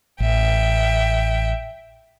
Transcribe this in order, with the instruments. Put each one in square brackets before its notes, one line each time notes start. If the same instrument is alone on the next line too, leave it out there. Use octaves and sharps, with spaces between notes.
[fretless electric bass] A1 [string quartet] E5 G5